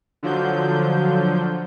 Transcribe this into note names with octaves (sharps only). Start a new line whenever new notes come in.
D3 F3 F#3 G6